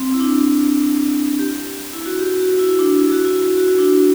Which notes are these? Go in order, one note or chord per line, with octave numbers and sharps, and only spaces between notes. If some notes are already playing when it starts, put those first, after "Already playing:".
Already playing: C4
E4
D4
G4
E4
F#4
G4
F#4
E4
D4
E4
F#4
E4
F#4
E4
D4